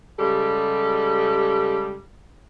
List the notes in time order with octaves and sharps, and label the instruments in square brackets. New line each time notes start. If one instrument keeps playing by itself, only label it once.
[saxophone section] C#3 G3 G#3 G4 A4